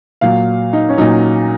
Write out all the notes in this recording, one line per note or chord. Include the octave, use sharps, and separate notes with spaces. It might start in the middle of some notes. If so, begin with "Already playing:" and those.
A#2 F#3 F5
D#4
C#4
A#2 F#3 D#4